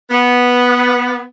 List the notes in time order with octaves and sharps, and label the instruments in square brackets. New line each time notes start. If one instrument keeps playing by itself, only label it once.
[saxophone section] B3